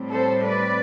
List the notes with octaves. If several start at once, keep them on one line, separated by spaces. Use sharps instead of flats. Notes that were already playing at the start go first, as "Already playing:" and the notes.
Already playing: A2 G3 C4
A4 C5
B4 D5